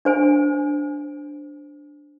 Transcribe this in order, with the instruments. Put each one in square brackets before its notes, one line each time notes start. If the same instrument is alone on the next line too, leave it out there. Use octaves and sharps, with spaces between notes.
[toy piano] D4 C5 G#5